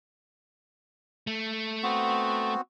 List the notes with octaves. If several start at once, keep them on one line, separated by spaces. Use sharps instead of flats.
A3
B3 C4 F#4